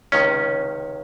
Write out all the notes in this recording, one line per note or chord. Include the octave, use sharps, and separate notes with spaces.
C#2 C3 D#3 C#4